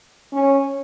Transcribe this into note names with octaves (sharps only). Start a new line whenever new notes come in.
C#4